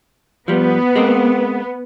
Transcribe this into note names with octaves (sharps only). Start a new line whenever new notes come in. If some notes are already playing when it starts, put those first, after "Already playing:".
F3 G3 B3
G#3 A#3 C4